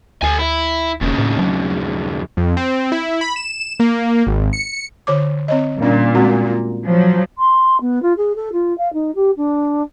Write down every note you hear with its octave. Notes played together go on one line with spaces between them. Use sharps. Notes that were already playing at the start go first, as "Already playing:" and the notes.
D2 A4 G#5
E4
E1 D#2 C#3
A2
F#3
F2
C4
E4
B5
E7
A#3
G#1
C#7
D3 C#5 D6
C4 C#5 D#5
A#2 G3 C#4 D4
G#3 C4 F#4
F4
F3 F#3
C6
B3
F4
G#4
A4
F4
F5
D#4
G4
D4